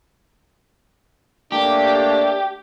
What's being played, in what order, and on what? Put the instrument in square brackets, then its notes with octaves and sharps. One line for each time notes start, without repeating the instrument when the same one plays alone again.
[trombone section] A3 A#3 D4 [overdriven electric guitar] G4